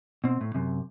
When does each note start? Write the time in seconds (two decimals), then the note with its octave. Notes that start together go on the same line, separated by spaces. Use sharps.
0.24 B2 C4
0.41 A2
0.54 F#2 C3